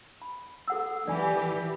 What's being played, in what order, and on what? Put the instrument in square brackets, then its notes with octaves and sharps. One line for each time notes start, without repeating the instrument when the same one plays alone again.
[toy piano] B5
A4 F#5 E6
[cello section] E3 G4 [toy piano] D5 G#5